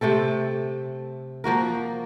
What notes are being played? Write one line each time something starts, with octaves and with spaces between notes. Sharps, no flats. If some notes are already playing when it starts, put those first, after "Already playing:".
C3 A3 C4 A4
F3 A#3 F#4 A#4